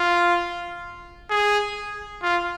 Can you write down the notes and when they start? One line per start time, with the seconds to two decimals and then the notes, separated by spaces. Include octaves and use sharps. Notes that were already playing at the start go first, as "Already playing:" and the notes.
Already playing: F4
1.30 G#4
2.23 F4